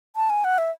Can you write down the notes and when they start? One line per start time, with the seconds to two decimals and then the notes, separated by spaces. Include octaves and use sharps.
0.16 A5
0.30 G#5
0.44 F#5
0.58 E5